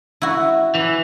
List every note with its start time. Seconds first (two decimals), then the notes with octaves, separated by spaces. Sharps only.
0.22 E4 F#4
0.75 E3